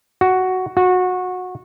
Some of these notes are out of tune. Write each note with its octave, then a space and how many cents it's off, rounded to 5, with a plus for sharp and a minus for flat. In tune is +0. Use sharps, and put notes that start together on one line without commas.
F#4 +5
F#4 -20